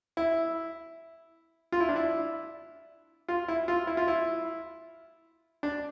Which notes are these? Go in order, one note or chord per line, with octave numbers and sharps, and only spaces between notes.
E4
F4
E4
D4
E4
F4
E4
F4
E4
F4
E4
D4